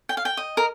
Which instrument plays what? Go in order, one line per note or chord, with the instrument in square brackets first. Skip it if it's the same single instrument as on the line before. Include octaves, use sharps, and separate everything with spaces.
[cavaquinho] G5
F5
G5
D#5
A#4